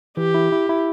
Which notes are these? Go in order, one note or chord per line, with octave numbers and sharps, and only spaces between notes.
E3 G4
E4
E4
E4